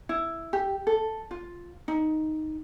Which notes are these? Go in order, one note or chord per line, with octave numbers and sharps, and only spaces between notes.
E4
G4
A4
F4
D#4